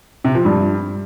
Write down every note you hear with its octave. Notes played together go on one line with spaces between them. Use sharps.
C3
F3
G2